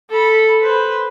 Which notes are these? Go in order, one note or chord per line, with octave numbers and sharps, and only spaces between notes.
A4 B5
B4 C5